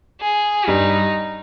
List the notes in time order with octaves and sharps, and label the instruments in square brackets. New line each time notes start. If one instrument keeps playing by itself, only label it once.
[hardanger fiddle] G#4
[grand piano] G2 G3 [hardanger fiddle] D#4